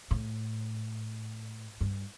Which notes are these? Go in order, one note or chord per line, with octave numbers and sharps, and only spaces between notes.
A2
G2